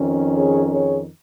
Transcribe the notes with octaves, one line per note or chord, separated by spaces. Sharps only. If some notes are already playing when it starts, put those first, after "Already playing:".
Already playing: F2 D#3 C#4
G#4 C#5
G#4 C#5